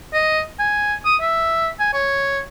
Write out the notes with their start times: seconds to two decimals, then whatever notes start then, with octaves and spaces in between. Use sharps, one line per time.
0.13 D#5
0.59 G#5
1.05 D#6
1.21 E5
1.79 G#5
1.93 C#5